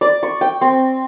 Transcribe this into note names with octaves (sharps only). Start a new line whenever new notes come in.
D5
C#6
G5
C4